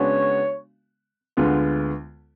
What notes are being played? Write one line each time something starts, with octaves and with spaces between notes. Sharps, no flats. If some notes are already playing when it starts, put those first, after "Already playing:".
Already playing: C#3 G#3 B3 D4 F#4 C#5
D2 D3 G#3 B3 F4